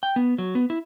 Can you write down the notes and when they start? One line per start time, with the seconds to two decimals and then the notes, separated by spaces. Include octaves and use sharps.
0.03 G5
0.16 B3
0.38 F#3
0.55 B3
0.70 E4